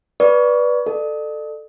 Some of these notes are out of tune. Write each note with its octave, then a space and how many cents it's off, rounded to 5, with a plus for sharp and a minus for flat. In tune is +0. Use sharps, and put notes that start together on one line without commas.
B4 -15 D5 +0 C#6 +25
A4 +0 D5 +40